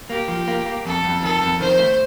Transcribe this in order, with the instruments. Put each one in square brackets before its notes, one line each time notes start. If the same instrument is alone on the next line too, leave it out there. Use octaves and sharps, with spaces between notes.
[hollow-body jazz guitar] A#3 [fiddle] G4
[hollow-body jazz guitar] F3
A#3
A#3
[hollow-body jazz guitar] F2 [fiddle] A4
[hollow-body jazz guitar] F2
[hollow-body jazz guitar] D#3 [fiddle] A4
[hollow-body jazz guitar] F2
[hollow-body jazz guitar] D#3 [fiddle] C5
[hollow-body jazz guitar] A3